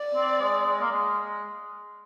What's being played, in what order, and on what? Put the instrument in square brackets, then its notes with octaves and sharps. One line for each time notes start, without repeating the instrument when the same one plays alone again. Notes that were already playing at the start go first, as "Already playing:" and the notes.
Already playing: [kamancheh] D5
[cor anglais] C4
G#3
G#3
A#3
G#3